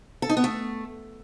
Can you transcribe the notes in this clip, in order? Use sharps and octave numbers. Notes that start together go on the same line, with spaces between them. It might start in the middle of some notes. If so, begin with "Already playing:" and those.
A4
D#4
B3
A3